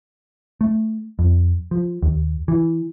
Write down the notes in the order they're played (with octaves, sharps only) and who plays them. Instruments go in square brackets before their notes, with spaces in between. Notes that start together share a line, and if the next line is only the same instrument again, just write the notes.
[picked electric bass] A3
F2
F3
D#2
E3